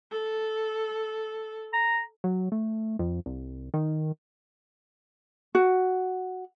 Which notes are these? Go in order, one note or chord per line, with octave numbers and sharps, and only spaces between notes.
A4
A#5
F#3
A3
F2
C2
D#3
F#4